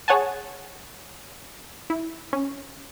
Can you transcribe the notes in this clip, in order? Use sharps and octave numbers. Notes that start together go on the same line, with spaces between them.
G#4 C#5 F#5 G#5 A5
E4
C#4